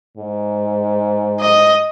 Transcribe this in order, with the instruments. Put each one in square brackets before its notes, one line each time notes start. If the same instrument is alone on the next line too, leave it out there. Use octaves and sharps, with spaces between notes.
[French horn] G#2
[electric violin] D#5